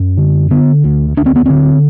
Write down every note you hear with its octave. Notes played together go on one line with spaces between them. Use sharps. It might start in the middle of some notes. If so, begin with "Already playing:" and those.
Already playing: F#2
D3
D3 B3
D2
D2 D4
C4
B3
D3 C4